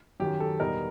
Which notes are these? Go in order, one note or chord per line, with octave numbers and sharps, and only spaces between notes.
F#2 D#3 F#3 G4
A4
E2 B2 G3 B3 D#4 A#4